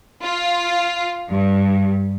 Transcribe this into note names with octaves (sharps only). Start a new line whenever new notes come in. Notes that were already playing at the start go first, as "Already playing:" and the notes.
F4
G2